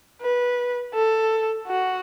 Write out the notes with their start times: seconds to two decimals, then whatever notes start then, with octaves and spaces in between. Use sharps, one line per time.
0.22 B4
0.94 A4
1.67 F#4